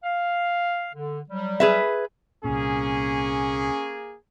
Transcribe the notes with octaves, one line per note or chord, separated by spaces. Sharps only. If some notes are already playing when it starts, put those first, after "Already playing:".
F5
D3
F#3 G3
G#4 B4 E5
C2 A#2 A#3 C#4 G#4